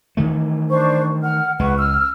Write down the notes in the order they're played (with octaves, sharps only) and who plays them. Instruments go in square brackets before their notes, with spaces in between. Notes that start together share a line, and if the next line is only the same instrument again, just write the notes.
[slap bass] D#3 E3 A3
[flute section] D4 C5 C#6
F#5 F6
[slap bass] C#2 G#3 [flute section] B4 F#5 C#6
[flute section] E6 F6